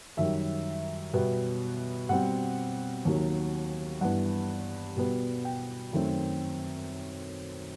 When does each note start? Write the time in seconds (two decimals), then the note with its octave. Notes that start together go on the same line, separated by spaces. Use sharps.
0.17 F#2 D#3 G3 E5
1.13 B2 G3 B3
2.09 B2 G3 C4 F#5
3.05 D#2 D#3 F#3
4.01 G2 E3 B3 F#5
4.97 B2 G3 B3
5.45 G5
5.93 F#2 D#3 A3 C4